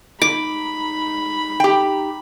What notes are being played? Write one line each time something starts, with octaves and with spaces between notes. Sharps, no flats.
D#4 B5 D6
G4 G5